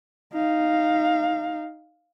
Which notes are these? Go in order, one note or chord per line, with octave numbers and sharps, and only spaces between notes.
D#4 F5